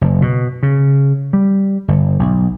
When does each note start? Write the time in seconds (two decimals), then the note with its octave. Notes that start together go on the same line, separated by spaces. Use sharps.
0.01 F#1
0.22 B2
0.63 C#3
1.33 G3
1.88 G1
2.19 B1